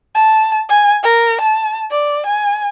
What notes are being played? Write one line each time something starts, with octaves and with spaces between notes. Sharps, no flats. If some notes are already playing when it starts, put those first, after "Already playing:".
A5
G#5
A#4
A5
D5
G#5